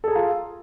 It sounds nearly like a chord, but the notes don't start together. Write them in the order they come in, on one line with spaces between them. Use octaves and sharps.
A4 G#4 A#5 F4